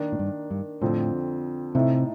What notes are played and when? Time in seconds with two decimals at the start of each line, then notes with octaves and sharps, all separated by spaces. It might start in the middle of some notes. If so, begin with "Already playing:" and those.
Already playing: D#3 A#3 D4
0.12 A2
0.19 G2
0.51 G2
0.81 F2 A2 D3 F3 C4
1.75 A2 C3 A3 D#4